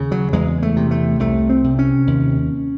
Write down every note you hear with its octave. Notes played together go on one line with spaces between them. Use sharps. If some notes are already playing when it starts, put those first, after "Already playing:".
Already playing: D#2 C#3
F#3
E2 G#3
A3
C3
A3
C2 A3
C4
C3
C#4
D#2